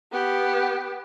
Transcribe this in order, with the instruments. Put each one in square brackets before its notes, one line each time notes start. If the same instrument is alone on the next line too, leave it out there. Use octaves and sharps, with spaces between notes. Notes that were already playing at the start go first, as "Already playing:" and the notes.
[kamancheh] B3 G4